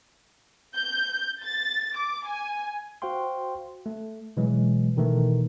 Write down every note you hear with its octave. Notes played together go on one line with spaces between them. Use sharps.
G6
A6
D6
G#5
F#4 C5 F5 G5 C6
A3
B2 E3 F#3 G#3
B2 D#3 E3 A3